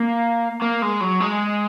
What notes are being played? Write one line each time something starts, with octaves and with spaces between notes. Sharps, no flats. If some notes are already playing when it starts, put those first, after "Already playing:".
Already playing: A#3
A#3
G#3
F#3
G#3